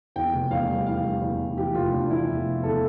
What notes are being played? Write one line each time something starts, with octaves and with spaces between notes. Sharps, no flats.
E2 G5
F1
E2 F5
G3
E3 F5
G3
E2
E3
E3 G4
F1 F4
F1 D4
E3 E4
E2
F1
E2 A4